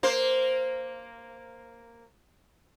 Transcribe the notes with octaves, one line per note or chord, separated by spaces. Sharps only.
A#3 C5